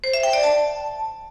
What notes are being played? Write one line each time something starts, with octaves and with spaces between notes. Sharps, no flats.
C5
E5
G5
D5
A5